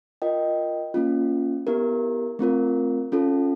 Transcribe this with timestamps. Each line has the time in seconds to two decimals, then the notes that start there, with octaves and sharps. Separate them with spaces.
0.22 F4 A#4 D#5 G5
0.94 A#3 C#4 F4
1.67 B3 E4 G4 A#4
2.39 A3 C4 F4 A#4
3.12 C#4 F4 A4